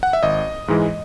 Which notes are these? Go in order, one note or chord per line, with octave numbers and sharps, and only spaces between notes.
F#5
E5
G#1 D#5
G#2 E3 G#3